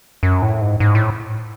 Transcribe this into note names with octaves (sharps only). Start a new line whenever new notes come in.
F#2
A2
G#2
G#2
A2